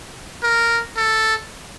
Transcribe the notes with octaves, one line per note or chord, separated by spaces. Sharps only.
A#4
A4